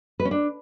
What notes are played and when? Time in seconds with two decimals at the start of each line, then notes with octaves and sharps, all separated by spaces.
0.20 B4
0.25 C#4
0.31 D4